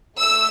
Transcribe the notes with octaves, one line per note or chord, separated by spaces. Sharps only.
A3 E6